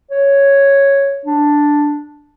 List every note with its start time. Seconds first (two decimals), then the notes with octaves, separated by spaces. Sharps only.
0.11 C#5
1.25 D4